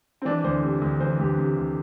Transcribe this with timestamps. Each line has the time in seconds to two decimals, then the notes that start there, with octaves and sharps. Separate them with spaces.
0.22 C4
0.25 E3 D4
0.44 D2 C5
0.63 C3
0.82 D2
1.00 E3 C5
1.19 D2 G4
1.38 C3
1.57 D2